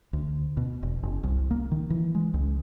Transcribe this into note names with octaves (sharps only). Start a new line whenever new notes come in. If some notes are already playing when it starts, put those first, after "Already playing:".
D2
B2
E1
F#1
C2
A#3
D#3
E3
G#3
C#2